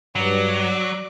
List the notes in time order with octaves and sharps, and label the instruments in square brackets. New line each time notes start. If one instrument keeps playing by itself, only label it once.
[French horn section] G2 [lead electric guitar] F#3 [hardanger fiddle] D5